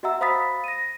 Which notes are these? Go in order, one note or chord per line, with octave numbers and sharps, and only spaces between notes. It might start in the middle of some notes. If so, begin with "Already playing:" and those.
F#4 D#5 E5 F#5 A#5 E6
C5 F5 B5 D#6 A6 B6
A#6 D#7